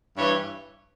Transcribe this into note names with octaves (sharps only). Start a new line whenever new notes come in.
G2 E3 C#5